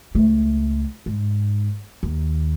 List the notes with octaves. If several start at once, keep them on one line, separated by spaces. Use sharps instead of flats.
C#2 A3
G#2
D#2